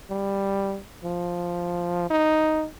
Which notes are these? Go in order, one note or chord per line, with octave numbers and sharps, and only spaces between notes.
G3
F3
D#4